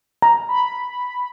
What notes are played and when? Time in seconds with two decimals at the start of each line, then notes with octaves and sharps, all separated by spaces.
0.22 A#5
0.49 B5